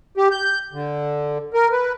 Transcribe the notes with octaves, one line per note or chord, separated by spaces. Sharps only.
G4
G6
D3
A#4
B4